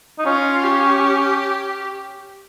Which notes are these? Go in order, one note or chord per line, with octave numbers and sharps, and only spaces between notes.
D#4
C#4 F4
G4